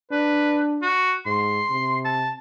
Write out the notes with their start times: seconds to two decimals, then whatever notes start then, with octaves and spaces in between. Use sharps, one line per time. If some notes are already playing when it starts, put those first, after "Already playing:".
0.11 D4 B4
0.82 F#4
1.26 G#2 C6
1.70 C3
2.05 A5